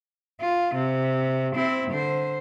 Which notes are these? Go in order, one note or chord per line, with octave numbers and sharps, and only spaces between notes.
F4
C3
C4 E4
D3 C5